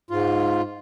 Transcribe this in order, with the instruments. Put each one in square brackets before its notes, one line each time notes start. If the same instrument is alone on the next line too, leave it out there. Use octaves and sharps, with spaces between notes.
[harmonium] G#2 F4